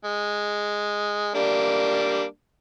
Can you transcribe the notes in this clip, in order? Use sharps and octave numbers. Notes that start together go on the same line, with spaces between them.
G#3
G3 A#3 D4